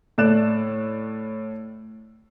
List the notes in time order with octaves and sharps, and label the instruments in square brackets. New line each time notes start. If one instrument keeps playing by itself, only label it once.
[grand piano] A2 A3 D5 F#6 E7